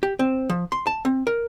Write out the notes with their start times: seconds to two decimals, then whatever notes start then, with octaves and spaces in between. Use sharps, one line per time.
0.03 G4
0.19 C4
0.50 F3
0.72 C6
0.87 A5
1.05 C4
1.27 A#4